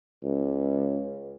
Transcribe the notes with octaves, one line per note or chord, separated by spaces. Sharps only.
C#2